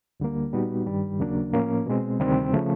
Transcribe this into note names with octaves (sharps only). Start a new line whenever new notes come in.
D2 D3 G3 A#3
A#2 G3 B3 D#4 F#4
G2 D#3 G3
D#2 C#3 F#3 A#3 D4
A2 F3 A#3 C#4
B2 G#3 C4
D2 C3 D#3 G3 C4
C#3 F3 A3